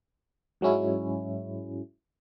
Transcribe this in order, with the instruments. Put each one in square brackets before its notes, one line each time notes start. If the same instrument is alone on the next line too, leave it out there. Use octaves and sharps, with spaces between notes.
[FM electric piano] G#2 F#3 G#3 C#4 E4